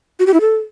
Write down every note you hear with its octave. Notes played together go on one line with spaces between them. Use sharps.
F#4
G4
E4
A4